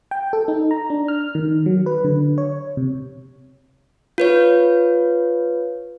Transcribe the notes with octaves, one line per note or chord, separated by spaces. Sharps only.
G5
A4
D#4
A#5
D4
F6
D#3
F#3
B4
D3
C#5
C3
F4 B4 C#5